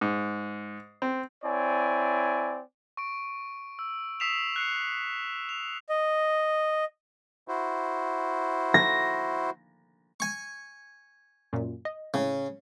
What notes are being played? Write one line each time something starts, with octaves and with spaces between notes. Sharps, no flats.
G#2
C4
C4 E4 C#5 D5 G#5
C#6 D7
E6
D#6 E6 B6 C7 E7 F7
F#6 C7 C#7
F7
D#5
E4 F#4 C5
A#6
G#5 C#6
F#2 A#2
D#5
A2 C#3